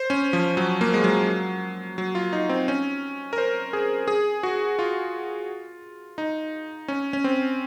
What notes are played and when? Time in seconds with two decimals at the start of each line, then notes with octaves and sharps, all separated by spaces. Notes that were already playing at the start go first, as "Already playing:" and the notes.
Already playing: C5
0.10 C#4
0.33 F3
0.57 F#3
0.81 A#3
0.94 G#3
1.04 F#3
1.98 F#3
2.15 F4
2.33 D#4
2.49 C4
2.68 C#4
3.33 A#4
3.38 C5
3.73 G#4
4.08 G#4
4.43 F#4
4.79 F4
6.18 D#4
6.88 C#4
7.13 C#4
7.24 C4